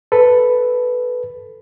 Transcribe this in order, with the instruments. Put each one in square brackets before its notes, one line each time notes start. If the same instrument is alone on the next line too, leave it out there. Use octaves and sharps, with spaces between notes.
[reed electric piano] A4 B4